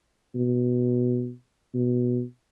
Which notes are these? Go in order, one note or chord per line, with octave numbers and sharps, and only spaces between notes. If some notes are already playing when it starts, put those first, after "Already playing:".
B2
B2